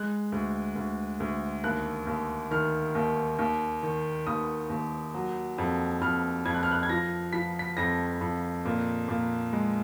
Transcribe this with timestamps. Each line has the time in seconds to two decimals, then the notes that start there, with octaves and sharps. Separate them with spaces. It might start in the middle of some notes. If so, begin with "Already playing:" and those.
Already playing: G#3 F#6
0.32 D2
0.76 D2
1.20 D2
1.64 D#2 F#6
2.07 D#2
2.51 D#3 F6
2.95 D#2
3.39 D#2
3.83 D#3
4.27 D#2 D#6
4.70 D#2
5.14 F#3
5.58 F2
6.01 F2 F6
6.45 F2 G#6
6.54 F#6
6.63 F6
6.71 F#6
6.83 G#6
6.90 F3 A#6
7.33 F3 B6
7.59 B6
7.77 F2 A#6
8.21 F2
8.65 A#2
9.08 A#2
9.53 G#3